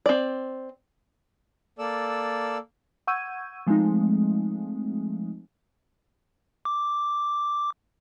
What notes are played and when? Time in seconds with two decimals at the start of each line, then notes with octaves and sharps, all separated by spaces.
0.06 C4 D5
1.79 A#3 A4 D5 E6
3.07 F#5 C#6 E6 G6 G#6 D#7
3.67 F3 G#3 A3 C4 D#4
6.65 D6